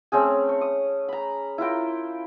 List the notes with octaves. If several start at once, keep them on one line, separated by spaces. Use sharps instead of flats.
A3 C4 C#4 G#4
C#5
D#6
A#5 B5
E4 F4 A#4 G5